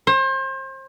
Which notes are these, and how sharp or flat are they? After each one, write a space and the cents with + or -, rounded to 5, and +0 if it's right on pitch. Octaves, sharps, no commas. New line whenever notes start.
C5 +35